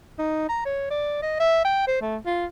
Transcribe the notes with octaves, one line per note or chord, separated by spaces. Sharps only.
D#4
A#5
C#5
D5
D#5
E5
G5
C5
A3
F4